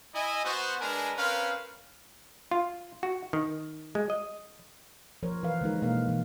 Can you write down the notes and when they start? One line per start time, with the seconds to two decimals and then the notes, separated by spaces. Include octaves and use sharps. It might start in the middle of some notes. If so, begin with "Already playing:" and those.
0.15 E4 D#5 G#5
0.44 B3 F#4 C5
0.81 G#3 D4 A#4 B4 G#5 A#5
1.17 C4 C#4 A#4 B4 F5
2.51 F4
3.03 F#4
3.33 D#3
3.95 G#3
4.10 D#5
5.23 F3 A#4 C5 C#5
5.43 E3 A#4 B4 F5
5.61 D3 G#3 D#4 A#4
5.82 B2 A#3 A#4 F5
6.08 E3